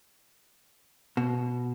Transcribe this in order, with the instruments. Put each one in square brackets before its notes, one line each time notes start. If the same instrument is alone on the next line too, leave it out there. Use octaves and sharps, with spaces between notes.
[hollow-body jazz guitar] B2